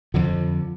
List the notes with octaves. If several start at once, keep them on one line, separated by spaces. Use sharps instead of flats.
F2 D3 F3